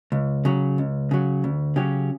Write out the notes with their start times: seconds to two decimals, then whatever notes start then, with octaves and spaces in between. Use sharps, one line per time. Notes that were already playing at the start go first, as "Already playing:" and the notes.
0.12 C#2
0.45 C#3 F#3
0.78 C#2
1.11 C#3 F#3
1.44 D2
1.76 C#3 F#3 C#4 G4